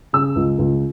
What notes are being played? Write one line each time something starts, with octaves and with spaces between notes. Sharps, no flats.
C#3 E6
C#2
C#2